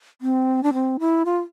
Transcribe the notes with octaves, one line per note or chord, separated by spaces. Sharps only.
C4
D4
C4
E4
F4